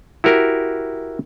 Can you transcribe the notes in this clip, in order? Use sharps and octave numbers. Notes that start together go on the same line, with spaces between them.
E4 F#4 G4 A#4